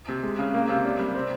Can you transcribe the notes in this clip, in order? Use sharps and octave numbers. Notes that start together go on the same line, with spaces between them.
C3
G#3
C#3
A#3
C3
D4
G3
C4